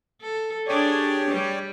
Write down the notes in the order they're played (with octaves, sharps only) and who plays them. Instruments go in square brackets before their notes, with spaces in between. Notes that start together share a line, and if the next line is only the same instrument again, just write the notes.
[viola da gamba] A4
[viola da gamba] D4 G#4 [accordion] G4 C#5 D5
[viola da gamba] G3